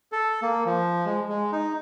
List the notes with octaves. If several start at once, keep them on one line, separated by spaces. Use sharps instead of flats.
A4
A#3
F3
G#3
G#3
D#4